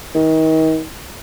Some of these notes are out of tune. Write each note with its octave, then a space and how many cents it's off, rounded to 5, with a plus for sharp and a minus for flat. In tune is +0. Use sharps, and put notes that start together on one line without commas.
D#3 +35